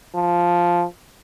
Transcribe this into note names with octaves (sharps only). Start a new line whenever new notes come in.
F3